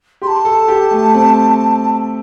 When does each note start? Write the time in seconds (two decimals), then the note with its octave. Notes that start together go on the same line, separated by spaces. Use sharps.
0.22 G4 C6
0.27 A5
0.45 A4
0.68 G4
0.91 A3
1.14 C4